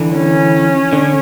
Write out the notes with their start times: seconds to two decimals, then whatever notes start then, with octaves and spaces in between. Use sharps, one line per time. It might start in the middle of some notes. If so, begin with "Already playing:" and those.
Already playing: D3 E3
0.15 C#4
0.93 D3